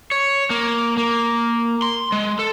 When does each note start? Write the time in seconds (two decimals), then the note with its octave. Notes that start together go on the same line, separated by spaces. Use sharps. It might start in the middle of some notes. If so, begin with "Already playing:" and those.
0.11 C#5
0.50 A#3
0.97 A#3
1.82 C6
2.12 G#3
2.39 A4